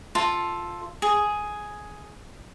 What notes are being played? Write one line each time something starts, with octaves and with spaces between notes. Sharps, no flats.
F4 A4
G#4